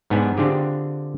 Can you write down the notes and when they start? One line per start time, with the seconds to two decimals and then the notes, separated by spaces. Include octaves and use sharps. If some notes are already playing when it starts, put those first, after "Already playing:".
0.10 G#2 B3 D4 G#5
0.37 D3 C4 D4 F4 G4 G#4